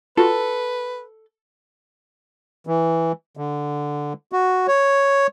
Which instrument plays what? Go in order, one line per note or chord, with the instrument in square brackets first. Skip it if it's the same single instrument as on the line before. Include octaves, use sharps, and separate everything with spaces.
[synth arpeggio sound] F4 F#4 [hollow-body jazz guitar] A4 [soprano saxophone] B4
[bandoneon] E3
D3
F#4
C#5